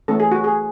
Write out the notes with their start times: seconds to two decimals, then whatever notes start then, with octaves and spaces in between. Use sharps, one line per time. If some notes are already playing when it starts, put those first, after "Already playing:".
0.08 E3 A3 C#4 A4
0.20 G#4
0.32 F#4
0.44 G#4